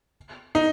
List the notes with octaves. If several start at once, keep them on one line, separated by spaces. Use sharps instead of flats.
D#4